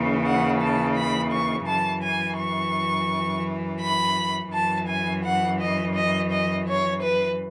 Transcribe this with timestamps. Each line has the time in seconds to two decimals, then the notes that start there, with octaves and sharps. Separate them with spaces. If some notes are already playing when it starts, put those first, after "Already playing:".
Already playing: D#2 C#3 E3
0.24 F#5
0.60 A5
0.96 B5
1.31 C#6
1.67 F#2 E3 A5
2.03 G#5
2.38 C#6
3.81 B5
4.52 F#2 E3 A5
4.88 G#5
5.24 F#5
5.60 D#5
5.95 D#5
6.31 D#5
6.67 C#5
7.02 B4